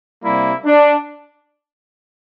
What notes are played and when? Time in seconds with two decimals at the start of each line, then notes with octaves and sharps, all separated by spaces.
0.23 C3 G3 A#3 E4
0.65 D4